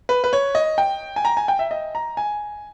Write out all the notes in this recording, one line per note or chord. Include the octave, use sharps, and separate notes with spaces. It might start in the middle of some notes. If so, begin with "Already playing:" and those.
B4
B4
C#5
D#5
G5
G#5
A#5
G#5
G5
E5
D#5
A#5
G#5